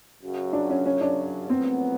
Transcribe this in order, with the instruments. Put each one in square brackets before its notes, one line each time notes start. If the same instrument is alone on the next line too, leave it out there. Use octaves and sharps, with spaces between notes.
[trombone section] F#2 C#3 F#3
[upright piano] D4
C#4
C#4
D4
[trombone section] A#1 A2 F#3 B3 [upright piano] C4